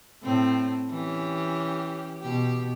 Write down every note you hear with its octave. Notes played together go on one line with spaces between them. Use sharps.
A2 C4
E3 C#4 G4
B2 G4